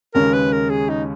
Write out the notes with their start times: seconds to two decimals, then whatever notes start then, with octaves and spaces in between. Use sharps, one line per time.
0.14 D#2 C#3 G#3 C#4 A#4
0.33 B4
0.52 A#4
0.69 G#4
0.89 D#4